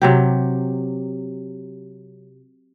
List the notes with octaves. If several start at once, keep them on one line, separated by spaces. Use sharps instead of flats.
C3 F#3 G4